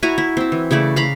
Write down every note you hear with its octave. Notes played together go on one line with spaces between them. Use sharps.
E4 F#4 G#5 A#5
E4
C4 E4
E3
C#3 A3 E4 D5
F5 A#5 B5